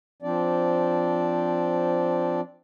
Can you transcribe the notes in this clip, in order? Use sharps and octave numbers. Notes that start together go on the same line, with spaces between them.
F3 C4 D4 D5